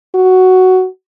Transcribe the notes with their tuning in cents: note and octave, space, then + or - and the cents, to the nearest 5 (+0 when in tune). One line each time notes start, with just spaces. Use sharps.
F#4 +5